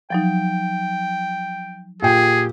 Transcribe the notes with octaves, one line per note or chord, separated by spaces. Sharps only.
F3 F#3 D#4 G5
A#2 G4 G#4 G5